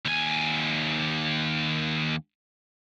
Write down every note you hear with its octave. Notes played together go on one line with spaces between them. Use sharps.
D#2 G#5